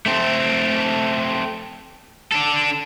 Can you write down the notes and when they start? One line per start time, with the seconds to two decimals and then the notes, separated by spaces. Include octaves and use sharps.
0.06 A3 C4
2.32 D4 A4